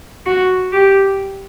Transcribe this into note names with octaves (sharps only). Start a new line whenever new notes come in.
F#4
G4